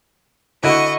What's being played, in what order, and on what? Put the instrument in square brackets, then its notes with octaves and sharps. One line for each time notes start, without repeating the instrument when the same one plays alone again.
[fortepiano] D3 E4 F#4 [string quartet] D#5 C#6